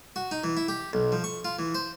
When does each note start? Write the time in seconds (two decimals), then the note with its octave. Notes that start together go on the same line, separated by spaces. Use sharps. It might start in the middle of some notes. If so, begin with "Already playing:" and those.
0.16 F#4
0.31 D#4
0.44 E3
0.57 E4
0.68 G4
0.93 B1
1.12 F3
1.24 C#6
1.45 F4
1.59 E3
1.75 C5